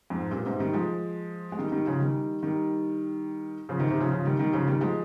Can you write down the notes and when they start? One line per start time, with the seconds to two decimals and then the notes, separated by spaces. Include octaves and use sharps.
0.10 F2 G#2
0.31 G2 A#2
0.46 G#2 C3
0.60 D#3 G3
0.73 F3 G#3
1.52 G#3
1.59 D#3 G3
1.72 D#3 G3
1.86 C#3 F3
2.00 D#3 G3
2.43 D#3 G3
3.69 C#3 F3
3.80 C3 D#3
3.90 C3 D#3
4.00 C#3 F3
4.11 C#3 F3
4.25 D#3 G3
4.39 D#3 G3
4.54 C#3 F3
4.67 D#3 G3
4.81 F3 G#3